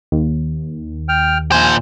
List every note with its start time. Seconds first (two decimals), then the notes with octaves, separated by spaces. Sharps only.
0.12 D#2
1.09 G5 F6
1.52 A#2 C5 G#5